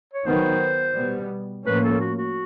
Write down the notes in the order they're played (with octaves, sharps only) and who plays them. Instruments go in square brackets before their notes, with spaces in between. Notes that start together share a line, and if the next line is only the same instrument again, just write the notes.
[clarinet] C#5
[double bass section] D#3 F#3 B3 [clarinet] C5
[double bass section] B2 G3 B3
[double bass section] A2 F3 A#3 C#4 [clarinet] B4
[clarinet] A4
F#4
F#4